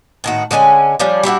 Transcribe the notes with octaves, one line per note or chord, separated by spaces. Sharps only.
A2 D#3 F#4
D3 G#3 C#4 G#5
F3 G3 C#4 D4
G3 D4 E4 F#4